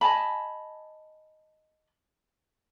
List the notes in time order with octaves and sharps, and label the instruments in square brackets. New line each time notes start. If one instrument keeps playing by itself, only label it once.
[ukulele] D#5 G#5 A5 B5